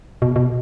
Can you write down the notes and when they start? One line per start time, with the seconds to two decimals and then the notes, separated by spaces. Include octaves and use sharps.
0.22 B2
0.36 B2